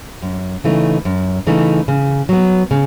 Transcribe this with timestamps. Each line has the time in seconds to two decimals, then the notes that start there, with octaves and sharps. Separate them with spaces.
0.22 F#2
0.64 C#3 E3 A3 D#4
1.05 F#2
1.47 C#3 E3 A3 D#4
1.88 C#3
2.29 F#3 B3
2.71 C#3